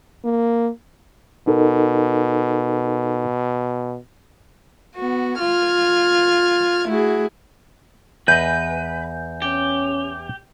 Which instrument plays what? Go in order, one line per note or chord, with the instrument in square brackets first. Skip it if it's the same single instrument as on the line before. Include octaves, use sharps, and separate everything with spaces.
[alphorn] A#3
[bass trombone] B2 [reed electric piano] D#4 A4 A#4
[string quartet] B3 F#4
F4 F6 G#6
A3 E4 F#4 G#4
[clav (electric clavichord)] E2 D#5 [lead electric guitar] B4 [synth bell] G6
[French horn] C#4 [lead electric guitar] G4